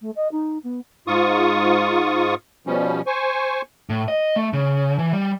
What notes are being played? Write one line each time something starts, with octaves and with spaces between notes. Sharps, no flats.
A3
D#5
D#4
B3
G#2 F4 C#6 D#6
B2 F3 G3 C#4
C5 G#5 C#6
A2
D#5
A3
C#3
E3
G3